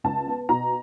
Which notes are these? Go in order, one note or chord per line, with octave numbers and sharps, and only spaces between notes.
C#2 A5
B3
B2 A#5